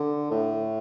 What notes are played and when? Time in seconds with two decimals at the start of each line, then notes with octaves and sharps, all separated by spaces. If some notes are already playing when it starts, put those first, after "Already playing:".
Already playing: D3
0.31 A2